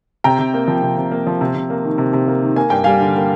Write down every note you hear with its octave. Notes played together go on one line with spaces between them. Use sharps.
C3 G5 A#5
C3
A#3
F3
C3
C3
A#3
F3
C3
C3
A#3
D#3
C3
C3
A#3
D#3
A#3 G#5
G2 G5
G3 F5 G#5
D3
A#3